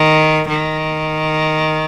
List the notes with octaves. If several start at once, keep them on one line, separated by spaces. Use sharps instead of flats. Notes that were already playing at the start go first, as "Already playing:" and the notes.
Already playing: D#3
D#3